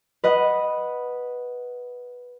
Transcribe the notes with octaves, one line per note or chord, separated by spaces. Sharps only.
B4 D#5 F#5